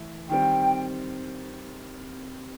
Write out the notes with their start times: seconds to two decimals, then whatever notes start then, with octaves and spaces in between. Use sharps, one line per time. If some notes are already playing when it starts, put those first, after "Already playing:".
Already playing: E3 A3 E4
0.29 D#3 G3 C4 G5